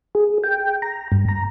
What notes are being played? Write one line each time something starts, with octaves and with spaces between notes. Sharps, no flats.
G#4
G5
A#5
G2
A#5